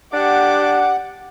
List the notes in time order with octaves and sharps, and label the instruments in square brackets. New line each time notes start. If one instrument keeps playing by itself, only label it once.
[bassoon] D4 [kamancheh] G4 D6 [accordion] F#5